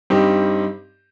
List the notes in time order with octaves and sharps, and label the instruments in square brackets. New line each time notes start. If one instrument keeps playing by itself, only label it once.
[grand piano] G2 G3 C4 D#4 G4